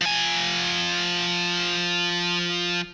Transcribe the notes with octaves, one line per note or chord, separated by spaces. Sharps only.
F3 G#5